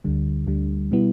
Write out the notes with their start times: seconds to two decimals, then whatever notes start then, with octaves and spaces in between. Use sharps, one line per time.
0.04 D2 D3 G3
0.47 D2 D3 G3
0.91 B2 G3 B3 E4